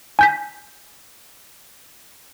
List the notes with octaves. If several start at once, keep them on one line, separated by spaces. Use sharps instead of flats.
G#5 G6 B6